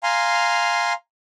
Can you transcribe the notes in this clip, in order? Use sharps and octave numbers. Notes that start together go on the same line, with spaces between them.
F5 G#5 A#5 C6